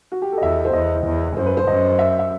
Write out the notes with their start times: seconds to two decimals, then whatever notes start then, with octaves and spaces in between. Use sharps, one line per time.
0.12 F#4
0.22 G4
0.32 A4
0.38 D#5
0.43 E2 E5
0.65 C5
0.73 E2 D#5
1.05 E2
1.36 F#2 C5
1.46 B4
1.57 C5
1.67 F#2 D#5
1.99 E5
2.19 E5